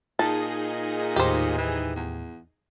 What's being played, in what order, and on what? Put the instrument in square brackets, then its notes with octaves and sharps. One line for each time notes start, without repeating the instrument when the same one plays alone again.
[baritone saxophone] A#2 [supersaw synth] D#4 G#4 D#5 [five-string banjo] A5
[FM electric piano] D#2 A2 [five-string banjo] G4 C5
[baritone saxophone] E3
E2